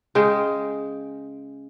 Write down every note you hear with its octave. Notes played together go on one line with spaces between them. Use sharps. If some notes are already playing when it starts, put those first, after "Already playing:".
C#3 G#3 G5